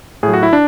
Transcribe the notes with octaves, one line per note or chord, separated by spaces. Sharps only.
A2 F#3 G#4
F#4
E4
D4